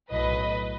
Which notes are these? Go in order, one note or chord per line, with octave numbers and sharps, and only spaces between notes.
B1 A2 F#3 B4 D#5